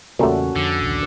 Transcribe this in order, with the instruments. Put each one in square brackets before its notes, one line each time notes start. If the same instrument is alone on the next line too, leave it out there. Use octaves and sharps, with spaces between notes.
[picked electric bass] E2 C#3 [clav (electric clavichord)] A#2 G3 A3 [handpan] C#4 F#4 A4
[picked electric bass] F2 [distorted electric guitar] D3
[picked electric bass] A#1 D#2